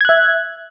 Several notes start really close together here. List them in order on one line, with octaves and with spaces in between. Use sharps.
G#6 F#6 E5